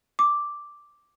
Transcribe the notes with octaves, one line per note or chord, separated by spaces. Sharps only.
D6